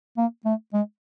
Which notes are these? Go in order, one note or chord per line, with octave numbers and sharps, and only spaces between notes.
A#3
A3
G#3